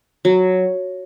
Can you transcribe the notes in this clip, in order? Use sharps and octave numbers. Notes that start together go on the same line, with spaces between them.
F#3